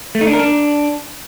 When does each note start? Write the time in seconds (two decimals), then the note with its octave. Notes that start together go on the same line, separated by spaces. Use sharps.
0.15 A3
0.21 D#4
0.27 D4
0.33 A#4
0.39 D4